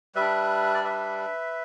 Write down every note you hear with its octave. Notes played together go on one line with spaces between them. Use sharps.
G3 D4 B4 E5
D5
B4 E5